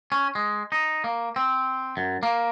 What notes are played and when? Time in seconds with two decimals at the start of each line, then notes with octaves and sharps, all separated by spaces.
0.12 C#4
0.35 G#3
0.72 D#4
1.04 A#3
1.36 C4
1.97 F#2
2.23 A#3